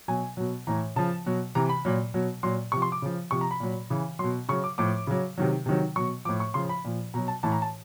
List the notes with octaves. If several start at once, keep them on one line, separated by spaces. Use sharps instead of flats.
B2 F#3 G#5
B2 F#3
A2 E3 A#5
C#3 F3 A5
B2 F#3
C3 E3 A#5
B5
A#2 F#3
B2 F#3
A#2 F#3 C6
C3 F3 C#6
C6
D6
C#3 F3
C3 F3 C#6
A#5
B5
A#2 F#3
C#3 E3
B2 F#3 C6
C#3 F#3 C#6
D6
A2 F3 D6
C#3 F#3
C3 D#3 F#3
C3 D#3 F#3
B2 F#3 C#6
A2 F3 D6
C#6
C#3 F3 C6
B5
A#2 F3
B2 F#3 A#5
A5
A2 E3 A5
A#5
A5